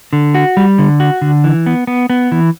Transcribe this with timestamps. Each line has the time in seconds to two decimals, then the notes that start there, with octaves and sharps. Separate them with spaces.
0.13 D3
0.34 F#4
0.57 G3
0.78 D3
1.00 F#4
1.22 D3
1.44 E3
1.66 B3
1.87 B3
2.10 B3
2.32 E3